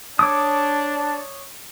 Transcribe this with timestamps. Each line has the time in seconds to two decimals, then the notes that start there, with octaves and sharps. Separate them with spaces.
0.19 D4 C#5 A5 D6 D#6